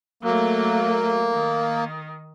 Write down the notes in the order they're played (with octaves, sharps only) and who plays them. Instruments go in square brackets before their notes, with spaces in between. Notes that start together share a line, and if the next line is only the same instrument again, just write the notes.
[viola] F#3 A3 [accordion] A#3
[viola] D#3